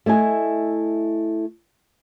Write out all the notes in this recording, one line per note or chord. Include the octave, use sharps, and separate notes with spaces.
A3 E4 D#5 G#5